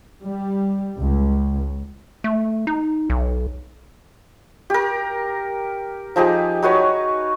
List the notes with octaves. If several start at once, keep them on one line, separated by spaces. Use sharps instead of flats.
G3
C#2
A3
D#4
B1
G4 A#4
F3 D#4 G4 G#4
D#4 F#4 B4 C#5